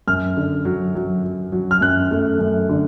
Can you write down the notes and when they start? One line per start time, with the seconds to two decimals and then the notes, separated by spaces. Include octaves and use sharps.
0.07 F#2 F6
0.37 D3
0.65 F#3
0.95 F#3
1.24 F#3
1.52 F#3
1.71 F6
1.81 F#2 F#6
2.11 A3
2.39 F#2
2.69 D3